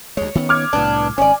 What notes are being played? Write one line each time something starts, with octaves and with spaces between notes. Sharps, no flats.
D2 G#3 C#5
D#3 B3 C#4
D6 F6 G#6
C2 A2 B3 D4
G#1 C#4 C#5 D5 G#5